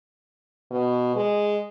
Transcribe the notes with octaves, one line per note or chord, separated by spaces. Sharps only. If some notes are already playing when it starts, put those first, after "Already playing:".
B2
G#3